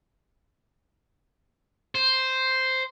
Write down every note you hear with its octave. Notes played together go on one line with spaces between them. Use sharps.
C5